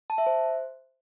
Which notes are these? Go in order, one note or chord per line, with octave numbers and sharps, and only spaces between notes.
A5
E5
C5